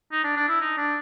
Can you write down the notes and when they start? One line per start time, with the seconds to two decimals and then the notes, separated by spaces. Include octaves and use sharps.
0.12 D#4
0.24 D4
0.36 D4
0.49 E4
0.61 D#4
0.78 D4